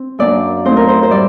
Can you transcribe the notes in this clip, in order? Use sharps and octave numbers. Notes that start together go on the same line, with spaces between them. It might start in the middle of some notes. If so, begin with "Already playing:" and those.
Already playing: C4
F#2 F#3 A#3 D4 D5
A#2 A3 C4 D#4 C5
A#4
C5
C5
A2 G3 D5